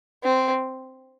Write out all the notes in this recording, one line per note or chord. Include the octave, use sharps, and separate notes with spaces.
C4